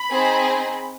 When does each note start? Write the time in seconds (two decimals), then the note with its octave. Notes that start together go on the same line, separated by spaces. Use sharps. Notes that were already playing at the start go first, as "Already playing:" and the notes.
Already playing: B5
0.10 C4 D#4 G#4